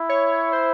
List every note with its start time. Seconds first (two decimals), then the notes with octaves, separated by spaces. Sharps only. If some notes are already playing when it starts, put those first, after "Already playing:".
Already playing: E4
0.09 C#5
0.53 C5